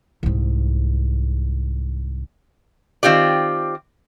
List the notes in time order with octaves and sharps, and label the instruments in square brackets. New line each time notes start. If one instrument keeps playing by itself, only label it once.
[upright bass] C2 G#2
[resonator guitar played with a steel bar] D#3 C4 F4 G4 D5